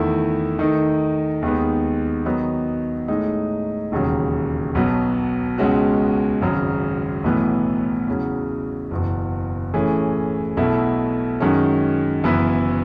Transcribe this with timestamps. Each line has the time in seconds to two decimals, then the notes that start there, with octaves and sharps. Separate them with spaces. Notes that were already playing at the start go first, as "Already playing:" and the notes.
Already playing: E2 D#3 A3 E4
0.59 D#3 A3 D#4
1.42 D#2 D#3 G#3 B3
2.26 D#3 F#3 B3 D#4
3.08 A2 G#3 D#4
3.92 E1 D#2 C#3 F#3
4.75 B1 B2 F#3 B3
5.58 C#2 B2 G#3 C#4 F#4
6.41 G#1 F#2 C#3 F#3
7.24 B1 A2 E3 B3
8.08 E2 C#3 F#3
8.91 F#1 E2 B2
9.74 A2 E3 A3 C#4 G#4
10.57 B1 B2 A3 E4 A4
11.40 F#2 D#3 G#3 C#4
12.24 F#1 F#2 E3 B3 E4